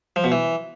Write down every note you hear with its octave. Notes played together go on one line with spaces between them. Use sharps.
F3
B2
E3